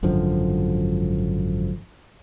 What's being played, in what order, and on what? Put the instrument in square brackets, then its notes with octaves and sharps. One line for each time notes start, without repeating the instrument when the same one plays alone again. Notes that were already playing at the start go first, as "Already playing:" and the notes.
[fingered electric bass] G#1 F#2 D3 F3